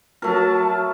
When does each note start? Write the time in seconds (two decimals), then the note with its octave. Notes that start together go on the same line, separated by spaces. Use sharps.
0.22 F#3 A3 A#4 A5